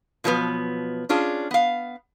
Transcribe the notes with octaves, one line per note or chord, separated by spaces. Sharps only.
B2 F3 F#3 A#3 B3
C#4 D4 F4 G#4
B3 F5